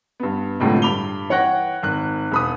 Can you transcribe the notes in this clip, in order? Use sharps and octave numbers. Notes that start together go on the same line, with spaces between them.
G2 B3
C2 A2 D3 F3 G#3
G2 B5 D6 F7 G7
E3 C#5 F#5 G5 F#6 A#6
G#1 F#6
E1 B5 D#6